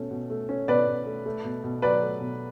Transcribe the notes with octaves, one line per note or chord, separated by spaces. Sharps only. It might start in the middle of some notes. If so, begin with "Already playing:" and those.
Already playing: B2 A3 C#4
B2
A3
C#4
B2 B4 D5
B2
A3
A3
B2
B2
F#3 B4 D5
A3
B2